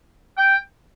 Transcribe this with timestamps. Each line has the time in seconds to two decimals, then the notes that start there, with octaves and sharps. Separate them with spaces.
0.37 G5